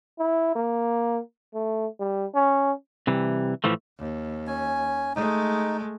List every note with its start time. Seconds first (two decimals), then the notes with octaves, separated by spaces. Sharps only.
0.19 E4
0.55 A#3
1.54 A3
2.00 G3
2.35 C#4
3.07 C3 E3 G3
3.64 A2 E3 F3 A3
3.98 D#2
4.47 C#4 G#5
5.15 G#3 A3 D#4